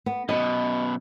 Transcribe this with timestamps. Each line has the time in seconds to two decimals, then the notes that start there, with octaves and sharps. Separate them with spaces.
0.06 B3
0.29 F#2 B2 D#5